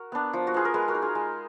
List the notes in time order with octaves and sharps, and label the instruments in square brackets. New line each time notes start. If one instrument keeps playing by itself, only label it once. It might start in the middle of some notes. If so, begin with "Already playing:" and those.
Already playing: [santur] F#4 A#4
B3 D4
F3
F#4
B3 F4 G#4
A#4
G#3 G#4 B4
F#4 A#4
D#4
F4 G#4
G#3